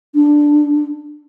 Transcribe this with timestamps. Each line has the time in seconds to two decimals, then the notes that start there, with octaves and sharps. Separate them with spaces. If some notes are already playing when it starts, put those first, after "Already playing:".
0.15 D4